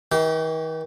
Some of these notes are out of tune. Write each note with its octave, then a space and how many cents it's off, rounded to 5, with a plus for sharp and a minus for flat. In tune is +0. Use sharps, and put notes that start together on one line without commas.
D#3 +45 G4 -40